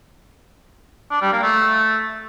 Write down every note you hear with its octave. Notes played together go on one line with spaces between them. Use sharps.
D4
G3
A#3
A3